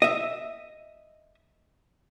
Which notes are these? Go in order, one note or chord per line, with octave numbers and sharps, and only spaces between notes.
D#5 E5